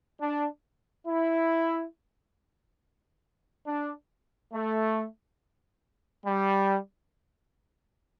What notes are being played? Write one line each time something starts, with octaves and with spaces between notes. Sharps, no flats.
D4
E4
D4
A3
G3